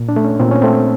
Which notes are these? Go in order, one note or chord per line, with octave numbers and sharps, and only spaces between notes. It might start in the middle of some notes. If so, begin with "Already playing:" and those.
Already playing: A#2
D4
A3
C#4
A#2 C4
C#4
A3 C4